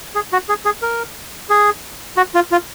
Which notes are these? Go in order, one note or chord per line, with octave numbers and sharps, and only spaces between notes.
G#4
F#4
G#4
G#4
A#4
G#4
F#4
F4
F4